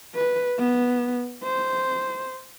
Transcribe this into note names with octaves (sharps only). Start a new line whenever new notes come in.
B4
B3
C5